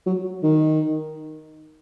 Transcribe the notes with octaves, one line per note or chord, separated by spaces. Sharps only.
F#3
D#3